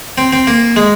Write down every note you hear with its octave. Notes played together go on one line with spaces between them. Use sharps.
C4
C4
A#3
G#3